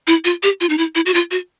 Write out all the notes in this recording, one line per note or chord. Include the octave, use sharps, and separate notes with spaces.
E4
F4
G4
F4
D#4
E4
E4
F#4
F4
F#4